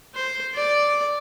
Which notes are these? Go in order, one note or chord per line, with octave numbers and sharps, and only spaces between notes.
C5
D5